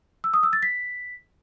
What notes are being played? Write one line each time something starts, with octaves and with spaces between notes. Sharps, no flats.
E6
D#6
E6
A6
B6